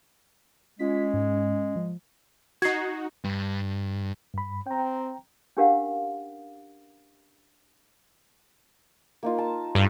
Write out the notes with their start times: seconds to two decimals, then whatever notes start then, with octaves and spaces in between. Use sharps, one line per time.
0.79 G#3 C#4 F4 B6
1.13 G#2
1.76 F3
2.62 D#4 F#4 G#6 C7
3.24 G2
4.34 G2 B5
4.67 C4 G5 A#5
5.57 C#4 D4 G4 A#4 F5 F#5
9.23 A#3 D#4 F4
9.38 A5
9.75 G2 A4